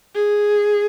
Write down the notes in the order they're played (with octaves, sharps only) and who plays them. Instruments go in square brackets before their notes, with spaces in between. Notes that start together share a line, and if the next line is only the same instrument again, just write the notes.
[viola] G#4